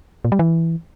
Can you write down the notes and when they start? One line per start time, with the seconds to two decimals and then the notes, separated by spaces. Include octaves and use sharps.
0.25 A#2
0.32 G3
0.39 E3